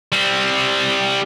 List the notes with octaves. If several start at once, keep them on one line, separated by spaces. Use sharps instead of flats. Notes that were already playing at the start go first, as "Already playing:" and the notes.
G3 C4